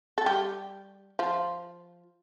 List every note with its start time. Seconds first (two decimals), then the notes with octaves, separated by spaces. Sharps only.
0.18 A4
0.26 G3 G4
1.19 F3 F4